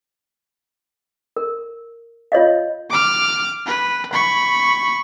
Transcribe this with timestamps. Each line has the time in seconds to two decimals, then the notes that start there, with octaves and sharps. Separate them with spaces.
1.36 A#4
2.32 F4 C#5 D#5 F5
2.90 D6 F6
3.67 B4
4.13 B5 C#6